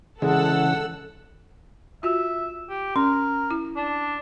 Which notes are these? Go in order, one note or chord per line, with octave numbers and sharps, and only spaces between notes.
C#3 E3 G#3 A4 F#5 E6
F4 F#4 E5
G4
C#4 A#4
E4
D4